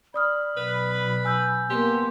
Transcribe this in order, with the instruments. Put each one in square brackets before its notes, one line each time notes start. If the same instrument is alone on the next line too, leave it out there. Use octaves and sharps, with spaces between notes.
[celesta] D5 D#6 F6 [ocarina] B5
[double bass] B1 [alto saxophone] B4
[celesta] G#5 E6 G6
[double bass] A#3 B3 [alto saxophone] G4 [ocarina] C6